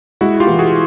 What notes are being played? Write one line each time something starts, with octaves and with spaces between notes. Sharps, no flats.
G#3 E4 F#4
F4 G4
E3
F#4 G#4